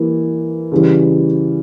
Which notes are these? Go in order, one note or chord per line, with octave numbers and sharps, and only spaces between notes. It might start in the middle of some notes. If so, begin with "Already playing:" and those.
Already playing: E3 G3 A#3
C#3 E3 G3